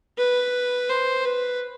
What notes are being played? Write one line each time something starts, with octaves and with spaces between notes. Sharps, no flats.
B4
C5
B4